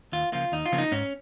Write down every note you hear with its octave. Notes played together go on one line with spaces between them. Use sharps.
D#2 F4
C#3 F3 A#3 F4
D#2 D#4
F4
C#3 F3 A#3
D#4
G#2 C#4